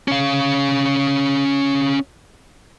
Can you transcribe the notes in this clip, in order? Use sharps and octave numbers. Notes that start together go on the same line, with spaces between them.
C#4 F5